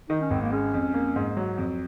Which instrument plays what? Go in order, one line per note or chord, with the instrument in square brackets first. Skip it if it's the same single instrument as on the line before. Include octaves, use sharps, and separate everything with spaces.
[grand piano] D#3 [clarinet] D#4
[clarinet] C#4
[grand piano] G#1 [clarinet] C4
[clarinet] A#3
[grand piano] G#3 [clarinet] C#4
[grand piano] F2
A#3
G#2
F#3
F2